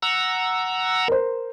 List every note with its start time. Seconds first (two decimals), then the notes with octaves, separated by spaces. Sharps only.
0.02 F#5 A#5 E6
1.08 A#4 C5